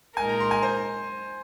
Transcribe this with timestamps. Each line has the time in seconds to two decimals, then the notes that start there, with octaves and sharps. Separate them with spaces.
0.17 A#2 G#3 D#4 A#4 G#5
0.29 A#5
0.40 C6
0.51 G#5
0.62 C5